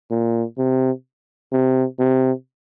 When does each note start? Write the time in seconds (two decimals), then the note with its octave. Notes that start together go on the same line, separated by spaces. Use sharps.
0.11 A#2
0.58 C3
1.52 C3
1.99 C3